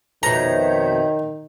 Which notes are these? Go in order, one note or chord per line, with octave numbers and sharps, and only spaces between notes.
F2 B2 D#3 C#5 E5 A#5 G6